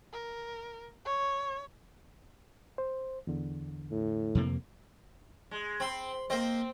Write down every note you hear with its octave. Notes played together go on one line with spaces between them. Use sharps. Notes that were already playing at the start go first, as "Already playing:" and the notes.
A#4
C#5
C5
E2 D3
A2
F2 C3 A#3
G#3
C4 B5 C6
A#3 C4 C5 D#5